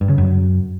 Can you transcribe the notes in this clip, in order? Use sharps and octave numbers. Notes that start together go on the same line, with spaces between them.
G2
C#3
F#2